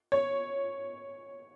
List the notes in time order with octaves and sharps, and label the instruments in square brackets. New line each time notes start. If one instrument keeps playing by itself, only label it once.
[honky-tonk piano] C#5